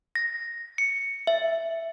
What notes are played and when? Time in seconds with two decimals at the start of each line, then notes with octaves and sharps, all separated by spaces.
0.15 A#6
0.78 C#7
1.27 E5